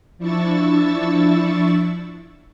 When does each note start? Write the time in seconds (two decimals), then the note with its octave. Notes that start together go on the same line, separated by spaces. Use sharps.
0.18 F3 D4 E4 C#6 E6 A6